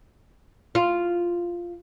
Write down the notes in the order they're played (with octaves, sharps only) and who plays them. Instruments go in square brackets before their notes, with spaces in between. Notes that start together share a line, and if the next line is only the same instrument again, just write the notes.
[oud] F4